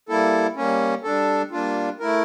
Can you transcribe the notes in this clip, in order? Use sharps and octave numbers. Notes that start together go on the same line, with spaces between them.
G3 A#3 E4 A4
G3 A#3 C#4
G3 D4 A4
G3 A#3 D4 F4
A3 E4 A#4